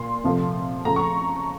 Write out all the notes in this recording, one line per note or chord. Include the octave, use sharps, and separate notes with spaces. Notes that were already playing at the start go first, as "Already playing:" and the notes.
Already playing: A#2 C6
C3 F3 A3
C#3 F3 A3 A#5
C#6